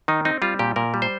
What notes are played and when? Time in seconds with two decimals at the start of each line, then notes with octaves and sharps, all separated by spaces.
0.08 D#3 D#4
0.25 C4 D#4
0.42 G3 F4
0.59 A#2 G4
0.76 A#2 A#4
0.94 G3
1.02 C5